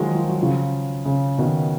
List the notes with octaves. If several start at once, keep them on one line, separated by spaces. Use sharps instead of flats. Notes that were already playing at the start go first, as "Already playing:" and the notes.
Already playing: D#3 F3 F#3 G#3
F3
F#3
C#3 F3
C#3
B2 D#3